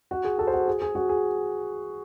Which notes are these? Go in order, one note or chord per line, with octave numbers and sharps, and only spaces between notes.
F#4
G#4
F#4 A4
C5
F#4 A4
G#4
G#4
F#4
G#4